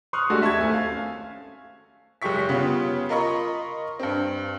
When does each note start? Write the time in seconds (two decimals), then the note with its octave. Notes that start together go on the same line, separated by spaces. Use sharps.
0.13 C6 C#6 D#6 F6 F#6
0.30 G#3 A3 D4 F#4 G4 A4
0.42 E5 A5 C#6 G#6
0.57 G#1 A3 A4 G#5
0.74 F5
0.90 C#4
2.22 F#1 G#3 G4 C#6 B6
2.49 C#3 G3 B3 F4
3.09 F4 A#4 D#5 B5 C#6
4.00 G2 C4